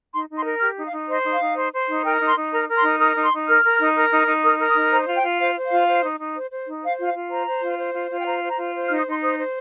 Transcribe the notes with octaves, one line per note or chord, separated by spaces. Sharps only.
D#4 C6
D#4
C6
A#4
G4 F6
D#4
F5
D#4
C5 D#5
D#4
F5
D#4
C5
C5
D#4
A#4 G5
D#4
C6
D#4
A#4 A#5
A#4
C6
D#4
A#4 D#6
D#4
C6
D#4
A#4 F6
A#4
D#4
A#4
D#4
D#4
A#4 D#6
A#4
D#6
D#4
C5 A#5
F4
G5
F4
C5 F5
C5
F5
F4
C5
D#4
D#4
C5
C5
D#4
C5 F5
F4
F5
F4
C5 A#5
C5
F4
C5
F4
F4
G5
C5 A#5
C5
A#5
F4
C5
F6
D#4
D#6
D#4 C6
C5 D#6
C5